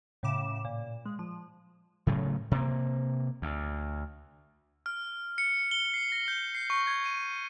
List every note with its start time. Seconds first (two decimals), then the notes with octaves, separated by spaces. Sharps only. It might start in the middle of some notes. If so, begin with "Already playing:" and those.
0.23 A2 C#3 D6 E7
0.65 A#2
1.06 G#3
1.19 F3
2.07 A2 C#3 F#3 A3
2.51 C3 A#3
3.42 D2
4.86 F6
5.38 C#7
5.71 G7
5.94 C7
6.12 A#6
6.28 G6
6.55 C7
6.70 C#6
6.87 G#6
7.05 D#7